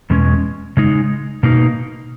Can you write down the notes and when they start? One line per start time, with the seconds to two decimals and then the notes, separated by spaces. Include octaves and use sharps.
0.10 E2 B2 G#3 C#4
0.77 C#3 G#3 D#4
1.43 B2 A#3 D#4